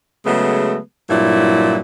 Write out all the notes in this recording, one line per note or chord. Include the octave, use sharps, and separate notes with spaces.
C#3 F#3 G#3 A3 B3
G2 A#2 F#3 E4